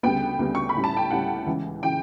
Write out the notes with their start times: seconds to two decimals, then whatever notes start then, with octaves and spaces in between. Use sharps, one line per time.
0.03 D2 C#3 G3 B3 G5
0.39 D2 C#3 G3 B3
0.55 C#6
0.69 B5
0.76 A2 G3 C#4
0.84 A5
0.97 G5
1.11 A2 G3 C#4 F#5
1.46 C#2 C#3 E3
1.83 C#3 E3 G5